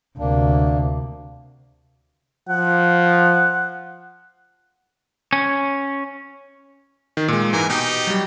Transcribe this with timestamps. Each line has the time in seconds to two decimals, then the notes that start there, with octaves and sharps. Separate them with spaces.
0.18 D2 C3 A#3 D4
2.49 F3 F#5
5.33 C#4
7.17 D#3
7.28 A#2 G#3
7.53 G#2 E3 A#4 G#5
7.69 B2 D#4 G4
8.07 F#3 G3